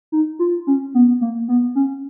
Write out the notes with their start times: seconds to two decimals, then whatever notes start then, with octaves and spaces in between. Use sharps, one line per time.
0.12 D#4
0.39 F4
0.67 C#4
0.94 B3
1.21 A#3
1.48 B3
1.75 C#4